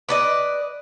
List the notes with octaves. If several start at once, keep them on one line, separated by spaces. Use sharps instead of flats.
B4 D5 D#5